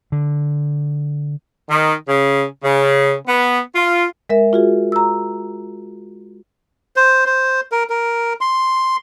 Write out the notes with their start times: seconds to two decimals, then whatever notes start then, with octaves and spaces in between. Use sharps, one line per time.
0.12 D3
1.69 D#3
2.07 C#3
2.63 C#3
3.27 B3
3.74 F4
4.30 G#3 A#4 E5
4.53 F4 F#4 G#4
4.92 A#5 E6
6.96 C5
7.26 C5
7.72 A#4
7.89 A#4
8.41 C6